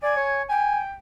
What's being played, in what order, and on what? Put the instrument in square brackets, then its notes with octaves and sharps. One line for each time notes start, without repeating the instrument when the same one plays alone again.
[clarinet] D5 [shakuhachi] G#5
[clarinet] C#5
[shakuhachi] G5 [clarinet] G#5